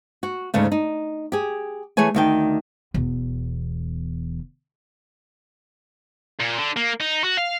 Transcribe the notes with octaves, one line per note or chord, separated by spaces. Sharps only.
F#4
D2 G#2 C#3 A3
D#4
G4 G#4
E3 A3 G#4 C#5 G#5
D2 D#3 G5
E1 E2
A#2
D3
A#3
D#4
F#4
F5